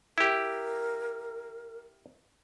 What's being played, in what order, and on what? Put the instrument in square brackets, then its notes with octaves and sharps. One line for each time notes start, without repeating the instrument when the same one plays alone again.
[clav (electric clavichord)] E4 G4 [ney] A#4